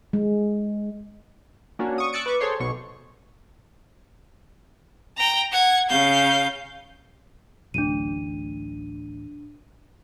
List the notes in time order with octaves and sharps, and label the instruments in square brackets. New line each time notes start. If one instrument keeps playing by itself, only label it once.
[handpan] G#3
[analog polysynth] A#3 C#4 D4 F#4
C#6 D#6
C#6 E6 F#6 A6 C#7 D7
B4 C#6 D6
G#4 A4 C5 C#5 C6
B1 B2 C#6
[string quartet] G5 A#5
F#5 G#6
C#3 F5 G6
[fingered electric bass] D1 A1 [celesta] D4 D#7